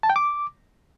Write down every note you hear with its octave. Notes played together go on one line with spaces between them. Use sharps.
A5
G5
D6